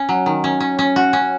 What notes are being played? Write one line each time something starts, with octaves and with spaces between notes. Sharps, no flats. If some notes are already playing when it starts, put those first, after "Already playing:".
Already playing: C#4
F#3
D#3
C#4
C#4
C#4
F#4
C#4